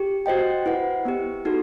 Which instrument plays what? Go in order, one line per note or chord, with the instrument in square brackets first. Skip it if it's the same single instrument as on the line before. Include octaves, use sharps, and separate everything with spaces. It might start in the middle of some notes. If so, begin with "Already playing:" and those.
Already playing: [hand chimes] G4
F#4 C5 D#5 G5
E4 B4 F#5
B3 E4 G4
D#4 F#4 A4